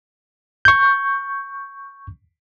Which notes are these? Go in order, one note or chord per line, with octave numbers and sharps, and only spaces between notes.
C#6 G6